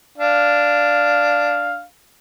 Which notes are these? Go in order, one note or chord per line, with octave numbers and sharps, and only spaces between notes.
D4 F5